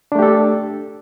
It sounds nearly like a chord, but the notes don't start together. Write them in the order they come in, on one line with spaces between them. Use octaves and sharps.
D4 A3 G4 A4